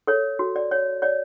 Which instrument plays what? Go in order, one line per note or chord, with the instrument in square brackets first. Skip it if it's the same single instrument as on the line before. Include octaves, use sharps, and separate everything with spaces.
[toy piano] A4 C#5
F#4
D5
C#5
C#5 D5